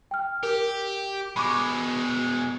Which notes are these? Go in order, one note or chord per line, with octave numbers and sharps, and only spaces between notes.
G5 F6
G4 A#4
B2 G#3 B5 C#6 D6